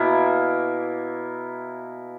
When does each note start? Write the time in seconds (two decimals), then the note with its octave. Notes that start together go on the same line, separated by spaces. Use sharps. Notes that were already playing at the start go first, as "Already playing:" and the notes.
Already playing: B2 A#3 E4